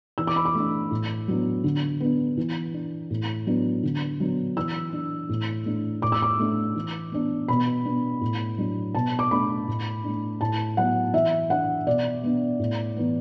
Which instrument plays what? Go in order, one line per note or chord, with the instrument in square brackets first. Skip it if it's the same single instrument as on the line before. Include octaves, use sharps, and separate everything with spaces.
[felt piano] E3 E6
D6
B5
D6
A3 D4
A2
F#3 B3 D4
D3
B3 D4
E3
D4
A2
F#3 B3 D4
D3
F#3 B3 D4
E3 E6
D4
A2
A3 D4
A2 D6
E6
D6
A3 D4
E3
B3 D4
B2 B5
B3 D4
A2
F#3 D4
B2 A5
D6
A3 D4 B5
A2
A3 D4
A2 A5
F#3 B3 F#5
E3 E5
D4 F#5
B2 D5
B3 D4
A2
E3 B3